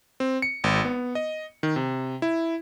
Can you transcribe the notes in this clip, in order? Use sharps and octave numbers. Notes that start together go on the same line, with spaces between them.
C4
C#7
G#1
B3
D#5
D#3
C3
E4